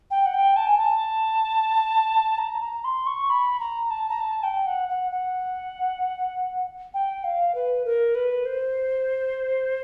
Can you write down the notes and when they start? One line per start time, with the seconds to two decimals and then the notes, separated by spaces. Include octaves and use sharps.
0.11 G5
0.26 F#5
0.34 G5
0.56 A5
0.67 G#5
0.78 A5
2.38 A#5
2.62 A#5
2.85 C6
3.07 C#6
3.30 B5
3.59 A#5
3.90 A5
4.09 A#5
4.21 A5
4.43 G5
4.66 F#5
4.89 F#5
5.12 F#5
6.94 G5
7.24 F5
7.55 B4
7.85 A#4
8.15 B4
8.45 C5